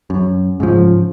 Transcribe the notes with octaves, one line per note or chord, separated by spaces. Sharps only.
F#2
G#2 C#3 F3